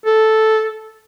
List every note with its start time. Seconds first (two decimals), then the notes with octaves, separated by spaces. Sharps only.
0.06 A4